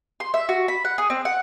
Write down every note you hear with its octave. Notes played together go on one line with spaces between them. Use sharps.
C6
E5
F#4
B5
F#5
G#4
C4
F#5